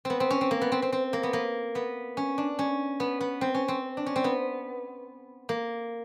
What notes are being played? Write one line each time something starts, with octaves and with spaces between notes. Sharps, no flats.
B3 C4
C4
C#4
C4
A#3
B3
C4
C4
C4
A#3
B3
A#3
B3
C#4
D4
C#4
B3
B3
C4
C#4
C4
D4
C#4
C4
B3
A#3